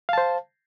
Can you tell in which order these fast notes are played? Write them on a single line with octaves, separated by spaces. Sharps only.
F5 A5 C5